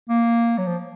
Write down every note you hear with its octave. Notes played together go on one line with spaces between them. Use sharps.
A#3
F#3
F3